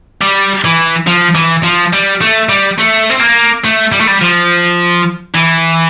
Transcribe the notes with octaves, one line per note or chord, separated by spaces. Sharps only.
G3
E3
F3
E3
F3
G3
A3
G3
A3
C4
A#3
A3
G3
A3
G3
F3
E3